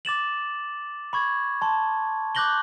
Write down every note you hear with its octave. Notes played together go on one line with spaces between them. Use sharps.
D6 A6 E7 F#7
B5 C#6 G#6
A5 C6
D6 F#6 G6 A#6 F#7 G7